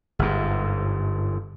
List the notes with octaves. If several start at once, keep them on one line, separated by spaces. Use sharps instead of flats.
G1 G#2